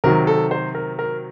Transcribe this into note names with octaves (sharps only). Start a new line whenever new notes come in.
C3 D#3 F#3 A#4
A4
C5
A#4
A#4